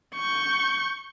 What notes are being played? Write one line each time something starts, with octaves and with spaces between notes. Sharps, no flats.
C#6 G6